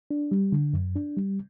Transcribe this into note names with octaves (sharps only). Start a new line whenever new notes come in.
D4
G3
D3
F#2
D4
G3